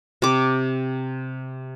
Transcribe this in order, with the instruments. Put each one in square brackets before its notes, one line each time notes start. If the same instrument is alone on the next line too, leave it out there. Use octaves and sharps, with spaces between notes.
[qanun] C3 D6